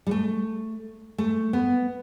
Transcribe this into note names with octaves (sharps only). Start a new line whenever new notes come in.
G3
A3
A3
B3